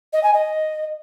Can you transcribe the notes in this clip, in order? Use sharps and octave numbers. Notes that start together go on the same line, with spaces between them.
D#5
G#5
D#5